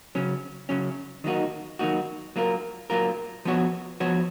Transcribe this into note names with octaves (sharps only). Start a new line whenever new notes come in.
C#3 F#3 C#4
C#3 F#3 C#4
D#3 F#3 A#3 D#4 F#4
D#3 F#3 A#3 D#4 F#4
F#3 A#3 F4 A#4
F#3 A#3 F4 A#4
F3 B3 F#4 C#5
F3 B3 F#4 C#5